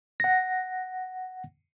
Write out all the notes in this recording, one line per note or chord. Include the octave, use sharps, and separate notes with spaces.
F#5 A#6